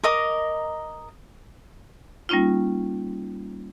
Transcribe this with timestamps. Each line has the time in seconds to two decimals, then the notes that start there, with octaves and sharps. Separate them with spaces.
0.04 A#4 D#5 A#5 D6
2.29 G3 A#3 C#4 D#4 F4